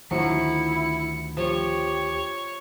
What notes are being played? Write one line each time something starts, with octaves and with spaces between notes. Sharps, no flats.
D2 D#3 F3 F#3 A3 E4 C#7
F3 G4 C#5